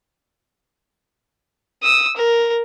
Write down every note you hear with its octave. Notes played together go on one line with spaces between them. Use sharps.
D#6 E6
A#4